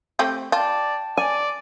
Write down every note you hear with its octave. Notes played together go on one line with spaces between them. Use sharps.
A3 C4 G4
F4 D5 G5 A5
D5 G#5